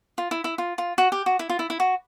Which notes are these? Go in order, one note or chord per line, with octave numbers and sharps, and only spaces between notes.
F4
E4
E4
F4
F4
F#4
G4
F#4
E4
F4
E4
E4
F#4